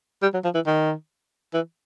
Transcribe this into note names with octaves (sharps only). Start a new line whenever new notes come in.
G3
F#3
F3
E3
D#3
E3